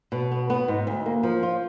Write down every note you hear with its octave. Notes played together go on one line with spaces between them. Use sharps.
B2
B3
B3
G#2
D2
A#3
F3
F4